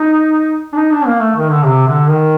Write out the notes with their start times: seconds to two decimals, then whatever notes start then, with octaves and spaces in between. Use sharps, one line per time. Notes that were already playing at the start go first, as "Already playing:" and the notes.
Already playing: D#4
0.73 D4
0.77 D#4
0.91 D4
1.06 A#3
1.21 A3
1.36 D#3
1.50 D3
1.65 C3
1.87 D3
2.09 D#3